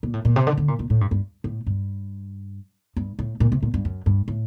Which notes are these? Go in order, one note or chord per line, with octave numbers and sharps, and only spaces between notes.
A#2
A2
A#2
C3
D3
D3
A#2
A#2
A2
G2
G2
A2
G2
G2
A2
A#2
C3
A#2
G2
F#2
G2
A2